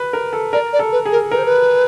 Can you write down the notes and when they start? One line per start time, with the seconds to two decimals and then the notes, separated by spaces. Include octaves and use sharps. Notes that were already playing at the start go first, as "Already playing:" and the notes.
Already playing: B4
0.13 A#4
0.33 A4
0.53 A#4 D5
0.73 D5
0.79 A4
0.92 B4
1.05 G#4
1.12 A#4
1.31 A#4 B4
1.38 C5
1.45 B4